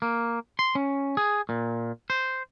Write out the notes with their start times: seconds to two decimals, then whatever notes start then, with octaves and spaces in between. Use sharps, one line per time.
0.02 A#3
0.59 C6
0.75 C#4
1.17 G#4
1.49 A#2
2.10 C5